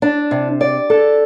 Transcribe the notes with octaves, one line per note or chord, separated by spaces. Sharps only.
D4
C3
D5
A4